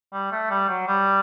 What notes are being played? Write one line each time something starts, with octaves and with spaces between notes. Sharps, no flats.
G3
A3
G3
F#3
G3